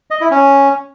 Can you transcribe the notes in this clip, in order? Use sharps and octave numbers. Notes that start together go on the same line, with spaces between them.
D#5
E4
C#4